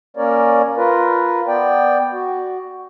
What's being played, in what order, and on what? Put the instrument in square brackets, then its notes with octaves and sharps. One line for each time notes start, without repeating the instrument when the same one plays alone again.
[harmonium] A#3 C#4 A#4 C#5 D5
F4 A#4 B4
B3 D5 G5
F#4